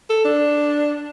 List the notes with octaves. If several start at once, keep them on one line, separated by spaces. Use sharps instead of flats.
A4
D4